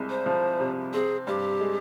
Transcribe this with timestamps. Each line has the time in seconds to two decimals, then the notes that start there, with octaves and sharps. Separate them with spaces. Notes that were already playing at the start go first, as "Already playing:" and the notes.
Already playing: C2 G#3
0.10 C5
0.26 F3
0.60 C3
0.93 C4 G#4
1.27 G2 G4
1.61 G#3